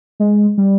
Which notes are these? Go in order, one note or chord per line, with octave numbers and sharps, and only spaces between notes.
G#3
G3